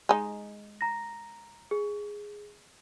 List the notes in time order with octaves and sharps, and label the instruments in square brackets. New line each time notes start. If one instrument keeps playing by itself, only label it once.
[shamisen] G#3 D#4
[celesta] A#5 A#6
G#4